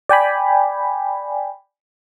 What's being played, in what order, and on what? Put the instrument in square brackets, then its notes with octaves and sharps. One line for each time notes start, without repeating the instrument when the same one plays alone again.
[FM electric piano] D5 G5 G#5 B5